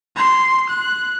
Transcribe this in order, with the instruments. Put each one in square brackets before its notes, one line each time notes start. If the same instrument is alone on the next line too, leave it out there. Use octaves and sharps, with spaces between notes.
[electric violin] C6
F#6